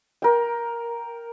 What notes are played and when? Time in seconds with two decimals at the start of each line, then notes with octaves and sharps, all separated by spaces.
0.22 A#4 G5